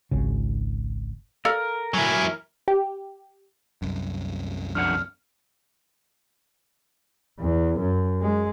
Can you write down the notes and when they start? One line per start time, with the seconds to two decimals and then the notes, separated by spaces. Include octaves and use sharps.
0.11 G#1 C#2 C#3
1.45 A4 A#4 D5 F5
1.94 F#3 E4 G#5
2.68 G4
3.82 C2 F#2
4.75 F2 D4 F#5 F6
7.40 E2
7.79 F#2
8.22 G#3